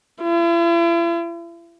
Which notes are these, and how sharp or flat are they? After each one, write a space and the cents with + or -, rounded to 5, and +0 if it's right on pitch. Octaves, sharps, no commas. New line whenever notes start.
E4 +45